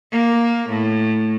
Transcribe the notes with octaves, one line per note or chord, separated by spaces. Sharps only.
A#3
A2